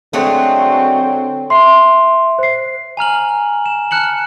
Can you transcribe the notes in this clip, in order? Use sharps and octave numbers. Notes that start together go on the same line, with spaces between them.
D3 F#3 G#3 A3 C4 C#5 G5
E5 C6 C7
C5 C7
G#5 A#5 F6 F#7
E7
A5 F6 F#6 C#7 F#7